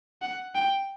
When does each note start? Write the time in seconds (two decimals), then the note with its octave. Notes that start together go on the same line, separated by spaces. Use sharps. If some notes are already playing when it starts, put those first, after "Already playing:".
0.22 F#5
0.55 G5